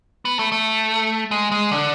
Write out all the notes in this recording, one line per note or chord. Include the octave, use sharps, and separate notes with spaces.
B3
A3
A3
G#3
G#3
D3